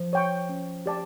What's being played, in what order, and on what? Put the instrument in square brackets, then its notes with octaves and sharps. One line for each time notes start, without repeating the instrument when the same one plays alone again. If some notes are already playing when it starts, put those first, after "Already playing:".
Already playing: [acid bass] F3
[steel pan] C#5 G5 C#6
C#4
G4 D5 A5